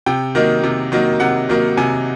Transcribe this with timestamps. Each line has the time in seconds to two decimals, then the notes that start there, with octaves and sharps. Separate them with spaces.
0.06 C3 G5
0.35 D#3 F#3 A#3 D#4
0.63 C3
0.92 D#3 F#3 A#3 D#4
1.20 C3 F#5
1.49 D#3 F#3 A#3 D#4
1.77 C3 G#5